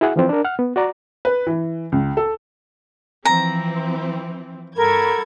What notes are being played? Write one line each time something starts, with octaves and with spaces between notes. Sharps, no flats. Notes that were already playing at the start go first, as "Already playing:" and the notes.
E4 F#4 G#4 E5 F#5
E3 F3 C4
D4 A#4
F#5 F6
B3
F#4 D5 A#5
B4
E3
C#2
A4
E3 F3 C4 A#5
G2 F#4 A4 A#4 B5 G#6